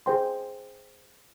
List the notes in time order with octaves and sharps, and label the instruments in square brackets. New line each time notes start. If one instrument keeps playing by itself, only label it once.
[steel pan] G#4 C5 G5 C6